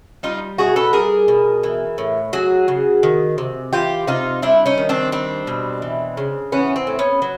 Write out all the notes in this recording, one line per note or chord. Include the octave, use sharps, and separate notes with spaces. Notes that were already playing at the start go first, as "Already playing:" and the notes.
G3 D#4 F4
B2 F#4 G#4
A4 B4
G3 G#4 A#4
B2
E3
A2
F#3 F#4 G#4
C#3
D#3
C3
E3 F4 G4
C3 D#4 F4
G3 D4 E4
C#4 D#4
D#3
C4 D4
G3 C4 D4
B2
E3
C#3
E3 B3 C#4
C4
A2
B3 C#4
F#3